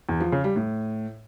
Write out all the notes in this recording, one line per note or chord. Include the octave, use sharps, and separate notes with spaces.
E2
F3
C#3
G3
A2